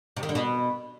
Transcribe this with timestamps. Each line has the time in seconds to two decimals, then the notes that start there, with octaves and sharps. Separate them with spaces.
0.17 C3
0.23 D#3
0.29 D3
0.35 B2